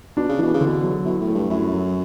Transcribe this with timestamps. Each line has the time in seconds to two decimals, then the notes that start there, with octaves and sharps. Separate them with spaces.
0.17 B2 D4
0.29 C#3
0.38 B2 E3
0.54 C#3
0.61 D3
0.66 B2
0.83 F#3
1.05 B2 E4
1.21 A2
1.28 A3
1.35 G2
1.50 F#2 E4
1.73 F#3